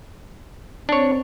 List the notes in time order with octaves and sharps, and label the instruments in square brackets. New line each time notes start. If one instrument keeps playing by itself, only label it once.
[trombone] C4 [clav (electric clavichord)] D4 C#5